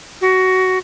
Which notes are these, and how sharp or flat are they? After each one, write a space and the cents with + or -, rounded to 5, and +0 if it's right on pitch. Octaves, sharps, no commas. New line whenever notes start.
F#4 +15